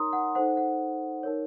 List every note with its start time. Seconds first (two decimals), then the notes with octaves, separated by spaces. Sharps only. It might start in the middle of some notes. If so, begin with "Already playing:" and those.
Already playing: D#4 A#4 C#5 A#5 C6 D#6
0.13 F#5
0.35 D#4 A4 C5 F#5
0.57 F#5
1.23 D#4 A#4 C#5